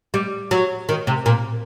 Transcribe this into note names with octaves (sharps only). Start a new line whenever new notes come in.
G3
F#3
D#3
C3
A#2